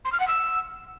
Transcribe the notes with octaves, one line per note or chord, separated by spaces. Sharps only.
C6
F6
F#5
E6